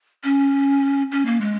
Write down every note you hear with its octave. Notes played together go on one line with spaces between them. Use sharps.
C#4
C#4
A#3
G#3